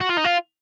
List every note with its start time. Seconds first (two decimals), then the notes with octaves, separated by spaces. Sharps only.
0.01 F#4
0.10 F4
0.18 D#4
0.25 F4